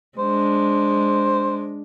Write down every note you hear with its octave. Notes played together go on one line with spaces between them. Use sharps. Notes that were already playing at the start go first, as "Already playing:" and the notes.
G#3 D4 C5